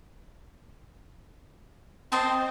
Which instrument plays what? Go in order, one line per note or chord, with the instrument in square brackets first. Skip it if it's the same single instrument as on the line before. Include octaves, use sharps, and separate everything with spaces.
[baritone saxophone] C4 [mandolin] C5 D#5 A5